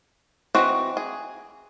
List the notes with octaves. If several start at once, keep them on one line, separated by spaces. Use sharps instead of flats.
E3 C4 F#4 D#5
G#4